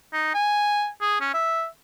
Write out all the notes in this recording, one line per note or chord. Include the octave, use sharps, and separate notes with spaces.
D#4
G#5
G#4
C#4
E5